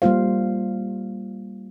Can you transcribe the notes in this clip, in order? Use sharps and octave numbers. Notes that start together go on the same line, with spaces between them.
G3 A#3 F4 C5 F5